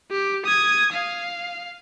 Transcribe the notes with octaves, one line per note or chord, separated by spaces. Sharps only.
G4
D#6 G#6
F5